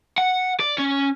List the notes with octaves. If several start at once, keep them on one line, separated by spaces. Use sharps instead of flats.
F#5
D5
C#4